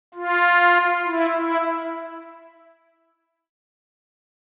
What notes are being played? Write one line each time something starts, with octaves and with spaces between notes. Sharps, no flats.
F4
E4
E4